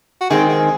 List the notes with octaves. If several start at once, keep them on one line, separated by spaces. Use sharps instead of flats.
F#4
D#3 G#3 C4 G#4
G#4